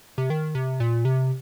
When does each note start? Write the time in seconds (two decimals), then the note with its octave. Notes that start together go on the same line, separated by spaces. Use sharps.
0.18 C3
0.30 D#3
0.55 C3
0.80 A#2
1.05 C3